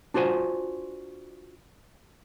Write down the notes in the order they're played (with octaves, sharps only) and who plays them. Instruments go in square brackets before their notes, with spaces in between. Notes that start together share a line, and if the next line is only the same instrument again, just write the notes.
[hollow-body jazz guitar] D4 F4 F#4 C5 G#5